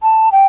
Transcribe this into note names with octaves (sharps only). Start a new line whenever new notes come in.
A5
G5